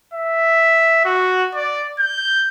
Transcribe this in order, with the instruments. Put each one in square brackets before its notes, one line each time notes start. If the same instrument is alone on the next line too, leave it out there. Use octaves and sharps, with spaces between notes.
[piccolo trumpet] E5
F#4
D5
G6